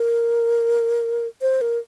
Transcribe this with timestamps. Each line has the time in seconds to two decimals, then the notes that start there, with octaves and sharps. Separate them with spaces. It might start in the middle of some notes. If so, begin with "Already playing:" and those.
Already playing: A#4
1.42 C5
1.61 A#4